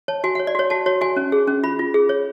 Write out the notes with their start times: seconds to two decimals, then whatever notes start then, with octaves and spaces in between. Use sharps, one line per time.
0.08 C#5 A5
0.24 F#4 G#5
0.35 F#5
0.39 C#5
0.47 D5
0.55 F#4 C#5
0.70 F#4 A5
0.86 F#4 C#5
1.01 F#4 G#5
1.16 C#4
1.32 G#4
1.47 C#4
1.63 F4 B5
1.79 F4
1.94 G#4
2.09 C#5